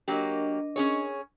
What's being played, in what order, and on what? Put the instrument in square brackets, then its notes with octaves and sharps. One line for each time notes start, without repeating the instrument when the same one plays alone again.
[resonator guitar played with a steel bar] F#3 A#3 G4 [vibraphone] D4 A#4 D#5
[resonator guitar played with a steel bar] C#4 G#4 C#5